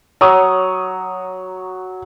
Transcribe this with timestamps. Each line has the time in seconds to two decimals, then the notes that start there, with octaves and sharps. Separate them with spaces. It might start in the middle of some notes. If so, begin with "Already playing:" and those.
0.21 F#3 C#5 C#6 D#6